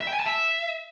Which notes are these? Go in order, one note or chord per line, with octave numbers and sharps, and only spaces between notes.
E5
G5
G#5
A5
E5